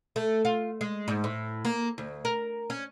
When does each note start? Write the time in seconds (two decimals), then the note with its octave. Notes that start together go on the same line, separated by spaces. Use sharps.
0.16 A3
0.45 F4
0.81 G#3
1.08 G#2
1.24 A2
1.65 A#3
1.98 D2
2.25 A#4
2.70 C#4